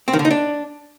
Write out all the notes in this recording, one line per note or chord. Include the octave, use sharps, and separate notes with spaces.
C4
D#3
D3
D#4
D4